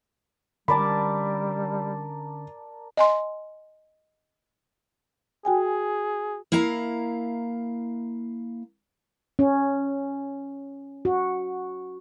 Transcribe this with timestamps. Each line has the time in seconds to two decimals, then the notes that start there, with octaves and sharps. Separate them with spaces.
0.68 D3 G3 C#4 A#4 D5 A5 B5
2.97 D#5 G#5 C6
5.45 F#4 G#4 G5 G#5
6.52 A#3 E4 F5 A#5
9.39 C#4
11.05 F#4